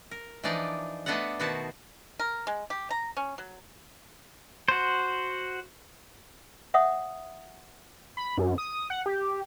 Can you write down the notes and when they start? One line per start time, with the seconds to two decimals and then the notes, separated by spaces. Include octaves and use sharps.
0.11 A#4
0.44 E3 F3 D4 D#4 D5
1.06 A3 B3 D4 A4 D#5 F#5
1.40 B2 D#3 B3 F#4 C5 A5
2.19 A#4
2.47 G#3
2.70 G4
2.91 A#5
3.17 C#4
3.38 F#3
4.68 F#4 C5
6.74 C#5 E5 F#5 D#6
8.17 B5
8.38 F#2
8.58 D#6
8.90 F#5
9.06 G4